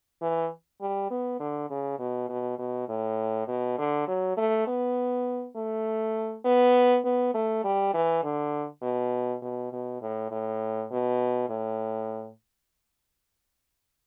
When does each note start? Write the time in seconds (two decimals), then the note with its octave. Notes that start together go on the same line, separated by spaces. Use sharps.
0.22 E3
0.81 G3
1.10 B3
1.40 D3
1.70 C#3
1.99 B2
2.29 B2
2.59 B2
2.89 A2
3.48 B2
3.78 D3
4.07 F#3
4.37 A3
4.67 B3
5.56 A3
6.45 B3
7.05 B3
7.34 A3
7.64 G3
7.94 E3
8.24 D3
8.83 B2
9.42 B2
9.72 B2
10.02 A2
10.31 A2
10.91 B2
11.50 A2